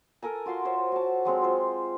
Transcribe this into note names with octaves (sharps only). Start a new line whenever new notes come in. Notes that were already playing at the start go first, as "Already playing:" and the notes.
A4 A#4 G#5 A#5
F4 F#4 F5 C6
C5 C#5 E5
F#4 A5
F#3 G#3 C4 C#5
F4 C5